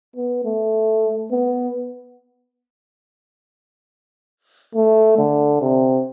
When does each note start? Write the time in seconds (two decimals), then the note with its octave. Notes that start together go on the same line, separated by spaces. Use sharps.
0.16 B3
0.45 A3
1.31 B3
4.75 A3
5.18 D3
5.61 C3